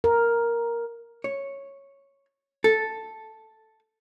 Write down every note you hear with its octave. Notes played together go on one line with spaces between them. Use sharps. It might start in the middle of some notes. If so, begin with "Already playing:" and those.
A#4
C#5
A4